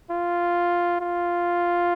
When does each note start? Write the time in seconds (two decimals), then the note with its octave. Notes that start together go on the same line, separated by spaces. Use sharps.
0.11 F4
1.01 F4